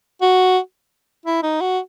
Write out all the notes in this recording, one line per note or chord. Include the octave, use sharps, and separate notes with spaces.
F#4
E4
D#4
F#4